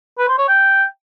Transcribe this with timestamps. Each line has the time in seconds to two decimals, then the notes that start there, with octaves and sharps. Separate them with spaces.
0.18 B4
0.28 C5
0.38 C#5
0.48 G5